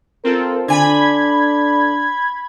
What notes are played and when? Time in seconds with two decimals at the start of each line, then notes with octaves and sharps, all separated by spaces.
0.24 C4 F4 A4 A#4
0.68 D3 D4 G#5 B5 G#6